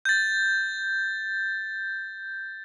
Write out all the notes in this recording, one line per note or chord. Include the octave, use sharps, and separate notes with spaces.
G6 A6